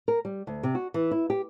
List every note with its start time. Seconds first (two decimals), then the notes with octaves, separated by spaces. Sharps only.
0.08 A#4
0.25 G3
0.47 D2
0.63 C3
0.75 F#4
0.94 E3
1.11 E4
1.30 G4